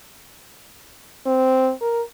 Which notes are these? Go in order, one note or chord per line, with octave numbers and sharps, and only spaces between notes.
C4
A#4